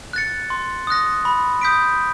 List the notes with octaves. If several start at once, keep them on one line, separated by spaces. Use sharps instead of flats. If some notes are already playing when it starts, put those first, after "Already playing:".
F#6 A6 C#7
C6
D#6 F#6 A#6
B5
D#6 G6 B6 D7